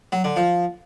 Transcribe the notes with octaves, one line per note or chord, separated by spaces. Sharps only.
F#3
D3
F3